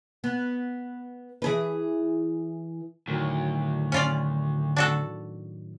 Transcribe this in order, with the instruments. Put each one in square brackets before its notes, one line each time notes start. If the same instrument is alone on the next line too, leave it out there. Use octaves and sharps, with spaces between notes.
[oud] B3
E3 G#4 B4
[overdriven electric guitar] D2 [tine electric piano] A2 D#3 F#3
[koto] C#4 F4 D5
D4 F#4 A4